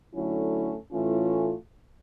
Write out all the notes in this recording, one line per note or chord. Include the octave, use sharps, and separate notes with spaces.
D3 F#3 A3 C#4 E4
A2 E3 A3 C#4 F4